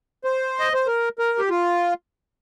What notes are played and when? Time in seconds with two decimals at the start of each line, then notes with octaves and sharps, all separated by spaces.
0.24 C5
0.59 D#5
0.74 C5
0.87 A#4
1.19 A#4
1.39 G4
1.50 F4